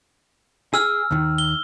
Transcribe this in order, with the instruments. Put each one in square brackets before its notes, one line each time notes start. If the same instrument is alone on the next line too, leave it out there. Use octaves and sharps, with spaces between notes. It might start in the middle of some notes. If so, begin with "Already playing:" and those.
[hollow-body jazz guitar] G#4 [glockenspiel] E6 F6
[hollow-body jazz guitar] D#2 D#3
[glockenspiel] G7